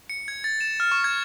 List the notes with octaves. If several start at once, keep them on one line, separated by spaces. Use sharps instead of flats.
C#7
G#6
A6
E7
F6
C#6
G#6